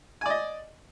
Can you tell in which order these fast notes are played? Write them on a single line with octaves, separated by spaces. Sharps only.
G#5 D5 D#5